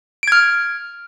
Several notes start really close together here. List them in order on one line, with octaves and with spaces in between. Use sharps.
D7 G#6 F6